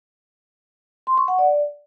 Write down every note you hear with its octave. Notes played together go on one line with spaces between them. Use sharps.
C6
C#6
F#5
D5